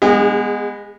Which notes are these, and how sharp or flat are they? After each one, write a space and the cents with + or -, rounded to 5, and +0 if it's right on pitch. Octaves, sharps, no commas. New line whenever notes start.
G#3 -10 B3 +0 G#4 -40